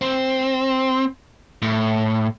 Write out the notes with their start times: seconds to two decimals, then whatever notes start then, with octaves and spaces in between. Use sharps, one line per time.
0.01 C4
1.62 A2